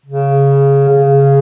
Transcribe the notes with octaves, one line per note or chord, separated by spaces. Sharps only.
C#3
C#3